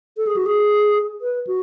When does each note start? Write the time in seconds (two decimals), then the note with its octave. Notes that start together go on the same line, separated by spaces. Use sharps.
0.17 A4
0.27 G#4
0.36 F#4
0.46 G#4
1.21 B4
1.47 F#4